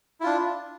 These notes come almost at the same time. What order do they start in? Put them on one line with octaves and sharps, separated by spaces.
E4 F4 D4